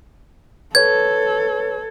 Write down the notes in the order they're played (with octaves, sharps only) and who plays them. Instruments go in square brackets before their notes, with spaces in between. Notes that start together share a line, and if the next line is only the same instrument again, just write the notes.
[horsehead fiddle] A4 [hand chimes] B4 C#5 [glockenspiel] G#6